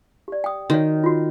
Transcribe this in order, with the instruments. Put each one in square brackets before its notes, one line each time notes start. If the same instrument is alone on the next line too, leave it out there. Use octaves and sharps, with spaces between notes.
[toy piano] G4 D5
G5 D#6
[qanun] D#3 [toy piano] F#4 C#5
[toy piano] F4 F#4